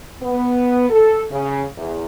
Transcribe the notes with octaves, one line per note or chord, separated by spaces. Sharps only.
B3
A4
C#3
E2